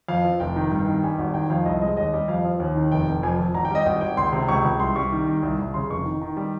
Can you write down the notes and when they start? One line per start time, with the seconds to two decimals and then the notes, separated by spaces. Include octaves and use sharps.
0.08 F2 F5
0.24 F3
0.40 F1 G5
0.56 D#3
0.72 G2
0.87 D#3
1.03 G3 G#5
1.18 G#1
1.34 D#3 G5
1.50 F2 F5
1.66 C2 D#5
1.81 G#3 D#5
1.97 D#2 D#5
2.14 G3
2.28 F2 F5
2.45 F3
2.60 D#2
2.75 D#3
2.92 F1 G5
3.07 F1
3.23 F2 G#5
3.38 F2
3.54 G#1 A#5
3.65 G5
3.71 G3 D#5
3.86 G#1 G5
4.01 G#1 G5
4.17 C#2 C6
4.32 C3
4.48 C#2 C#6
4.64 C#2
4.80 C2 C6
4.96 G3 C#6
5.12 D#3
5.27 D#3
5.43 C2
5.59 C2
5.74 C#3 C6
5.90 F1 C#6
6.06 D#3
6.21 D#3
6.37 G3